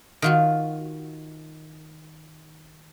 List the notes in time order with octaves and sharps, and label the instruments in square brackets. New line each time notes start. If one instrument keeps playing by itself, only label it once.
[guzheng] D#3 F4 F#4